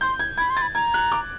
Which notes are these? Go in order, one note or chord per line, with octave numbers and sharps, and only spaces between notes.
C6 G6
G#6
B5 G#6
C6
A6
B5
A#5 G#6
F#6
D6